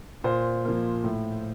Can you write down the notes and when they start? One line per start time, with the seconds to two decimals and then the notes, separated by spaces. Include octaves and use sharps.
0.24 A#2 C5
0.65 F3 A#3
1.04 A2